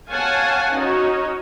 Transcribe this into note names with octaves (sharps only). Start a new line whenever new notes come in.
C#5 F5 F#5 G#5 A5
C#4 D#4 F#4 C#5